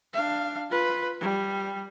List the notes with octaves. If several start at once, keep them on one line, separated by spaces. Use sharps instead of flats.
D4 F5
F4 B4
G3